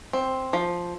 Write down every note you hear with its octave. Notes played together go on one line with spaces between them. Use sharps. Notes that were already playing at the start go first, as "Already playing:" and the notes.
C4
F3